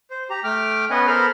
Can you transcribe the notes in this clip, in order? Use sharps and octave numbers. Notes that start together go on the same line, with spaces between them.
C5
G4 A#5
A3 G5 D6 F6
B3 C#4 B4 D#5 F#5 G#5
B3 A4 A#4 C5 B5 F6